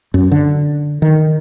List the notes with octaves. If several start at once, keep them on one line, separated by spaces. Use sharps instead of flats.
F#2
D3
D#3